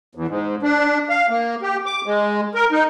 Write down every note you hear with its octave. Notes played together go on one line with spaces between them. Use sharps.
E2
G#2
D4
F5
A#3
G4
D6
G#3
A#4
D#4